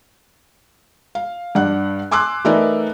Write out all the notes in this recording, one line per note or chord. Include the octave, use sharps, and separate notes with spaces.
F5
G2 D4 F#5 F#6
G#5 C6 D6 E6 F#6
E3 A3 D#4 A#4 B4 D5